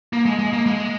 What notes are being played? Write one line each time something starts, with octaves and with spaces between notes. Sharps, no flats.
A#3
G#3
G#3
A#3
G#3